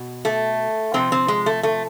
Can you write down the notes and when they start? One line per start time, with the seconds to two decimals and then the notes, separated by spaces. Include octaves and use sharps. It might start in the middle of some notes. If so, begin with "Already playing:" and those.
Already playing: B2
0.25 A3
0.94 C3 F3 C4
1.12 C4
1.28 G#3
1.46 A3
1.63 A3